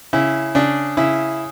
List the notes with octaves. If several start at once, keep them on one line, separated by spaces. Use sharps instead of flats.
C#3 E4
C#3 D4
C#3 E4